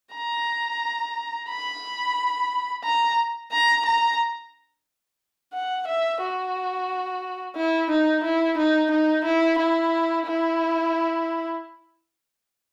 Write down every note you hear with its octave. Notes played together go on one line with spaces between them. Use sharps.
A#5
B5
A#5
A#5
A#5
F#5
E5
F#4
E4
D#4
E4
D#4
D#4
E4
E4
E4